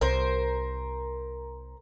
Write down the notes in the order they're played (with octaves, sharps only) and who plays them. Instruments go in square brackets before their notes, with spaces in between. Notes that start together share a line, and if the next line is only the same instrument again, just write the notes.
[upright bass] C2 [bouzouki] A#4 C5